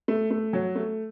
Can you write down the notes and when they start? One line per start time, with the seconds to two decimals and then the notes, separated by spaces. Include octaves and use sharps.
0.08 A3
0.31 A3
0.53 F#3
0.75 A3